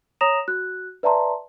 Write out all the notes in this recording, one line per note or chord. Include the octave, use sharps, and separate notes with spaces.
C#5 A#5 D#6 A#6 E7 F7
F#4 F#6
B4 D5 E5 A5 A#5 C6